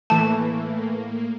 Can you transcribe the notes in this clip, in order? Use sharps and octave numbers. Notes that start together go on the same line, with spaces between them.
A2 E3 A3 A#3 A5